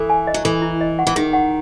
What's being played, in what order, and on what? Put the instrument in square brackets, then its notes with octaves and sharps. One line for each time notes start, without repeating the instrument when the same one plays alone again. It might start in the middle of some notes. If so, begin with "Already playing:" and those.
Already playing: [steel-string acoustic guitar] E3 [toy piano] A4
[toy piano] G#5
D#5
[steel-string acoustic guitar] F#3
[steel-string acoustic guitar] E3 [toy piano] A4
[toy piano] E4
D#5
F#5
[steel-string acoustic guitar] E3
[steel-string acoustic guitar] D#3 [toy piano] G#4
[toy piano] F#5